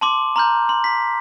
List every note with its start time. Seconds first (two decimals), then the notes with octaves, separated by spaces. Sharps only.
0.01 A5 C6 D6
0.36 A#5 C6 F6 G6
0.69 C6
0.84 B6